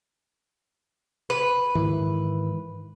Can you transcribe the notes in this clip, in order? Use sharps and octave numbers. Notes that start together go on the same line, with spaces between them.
B4
G#2 D#3 E3